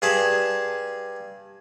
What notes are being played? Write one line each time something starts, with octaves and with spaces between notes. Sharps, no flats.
G2 G#4 A5 B5